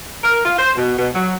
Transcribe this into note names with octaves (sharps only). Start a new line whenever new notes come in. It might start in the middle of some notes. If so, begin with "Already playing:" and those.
A#4
F4
C5
B2
B2
F#3